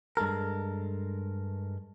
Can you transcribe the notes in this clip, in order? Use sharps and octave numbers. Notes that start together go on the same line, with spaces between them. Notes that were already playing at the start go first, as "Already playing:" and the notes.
G2 G#3 A4 A#4